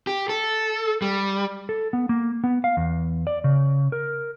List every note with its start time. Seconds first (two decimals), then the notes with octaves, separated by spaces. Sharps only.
0.07 G4
0.29 A4
1.02 G3
1.69 A4
1.93 B3
2.09 A#3
2.44 B3
2.64 F5
2.77 E2
3.27 D5
3.44 C#3
3.92 A#4